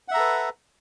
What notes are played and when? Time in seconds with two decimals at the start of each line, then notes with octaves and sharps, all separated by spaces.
0.08 F#5
0.11 E5
0.14 A#5
0.17 A4
0.20 B4